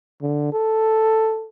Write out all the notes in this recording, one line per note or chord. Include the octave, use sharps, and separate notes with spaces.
D3
A4